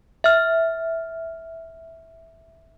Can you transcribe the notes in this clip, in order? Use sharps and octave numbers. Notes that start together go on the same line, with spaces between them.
E5 F6